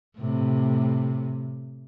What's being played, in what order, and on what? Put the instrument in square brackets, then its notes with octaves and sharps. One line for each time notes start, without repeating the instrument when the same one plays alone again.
[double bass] A2 C3